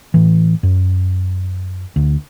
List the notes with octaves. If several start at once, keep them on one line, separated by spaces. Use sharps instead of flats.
A2 E3
F#2
D2